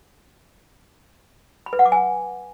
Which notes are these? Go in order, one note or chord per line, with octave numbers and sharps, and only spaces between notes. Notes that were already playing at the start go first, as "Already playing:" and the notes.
B5
B4
F#5
D6
G#5